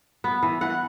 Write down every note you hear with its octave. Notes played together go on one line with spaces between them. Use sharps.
B3
E3
E3 F#5